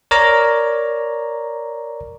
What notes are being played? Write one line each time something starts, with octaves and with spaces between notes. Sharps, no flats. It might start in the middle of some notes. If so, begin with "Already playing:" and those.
A#4 C#5 D5 A#5